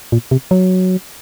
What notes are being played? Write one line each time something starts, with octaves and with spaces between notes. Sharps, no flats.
A#2
C3
F#3